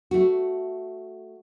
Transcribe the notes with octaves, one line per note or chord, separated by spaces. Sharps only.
A3 F#4